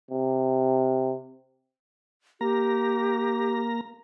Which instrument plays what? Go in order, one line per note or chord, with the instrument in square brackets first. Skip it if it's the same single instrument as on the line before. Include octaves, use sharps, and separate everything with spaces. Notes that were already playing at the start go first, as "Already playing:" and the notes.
[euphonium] C3
[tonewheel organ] A#3 A#5 [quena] G4